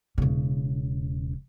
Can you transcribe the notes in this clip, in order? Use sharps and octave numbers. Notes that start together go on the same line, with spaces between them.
E1 C#3